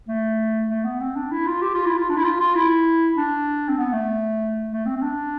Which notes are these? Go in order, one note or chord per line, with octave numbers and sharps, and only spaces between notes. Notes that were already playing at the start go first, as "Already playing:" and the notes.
A3
A3
B3
C4
D4
E4
F4
G4
F4
E4
F4
D4
E4
F4
F4
E4
D4
C4
B3
A3
A3
C4
C4
D4